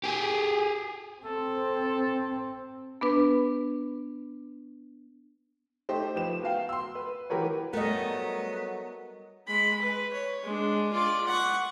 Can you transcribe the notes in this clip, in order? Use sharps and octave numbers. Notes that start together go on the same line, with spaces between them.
G4 G#4
C4 A4
B3 D4 B4
A3 D#4 G4 C5
F3 G4 B4 E7
B3 F#4 F5 G5
C6 E6
B4
E3 F#4 G4 A#4 B4 C#5
F#3 G3 A3 B3 A#4 D#5
G#3 B5
B4
C#5
G#3 D4
F4 D5
F#5 C#6